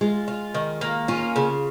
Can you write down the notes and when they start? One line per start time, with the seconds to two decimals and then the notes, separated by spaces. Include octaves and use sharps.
0.01 G#3 F4
0.28 F4
0.54 D#3
0.81 A#3
1.08 C#4 F4
1.36 C#3